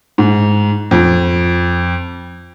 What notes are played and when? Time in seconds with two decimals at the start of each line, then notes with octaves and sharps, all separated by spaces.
0.18 G#2
0.91 F2